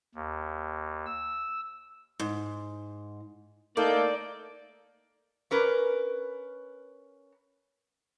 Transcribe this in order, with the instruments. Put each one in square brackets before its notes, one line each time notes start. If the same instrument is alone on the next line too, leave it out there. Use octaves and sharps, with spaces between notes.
[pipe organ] D#2
E6
[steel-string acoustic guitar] G#2
[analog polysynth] A3 A4 G6 [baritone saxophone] A#3 [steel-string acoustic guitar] D#4 [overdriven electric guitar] D5
[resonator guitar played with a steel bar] C#4 A#4 B4